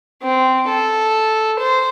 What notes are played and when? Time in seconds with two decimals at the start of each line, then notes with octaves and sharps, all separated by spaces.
0.23 C4
0.69 A4
1.60 C5